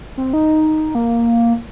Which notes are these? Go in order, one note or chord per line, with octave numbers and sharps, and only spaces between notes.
C4
D#4
A#3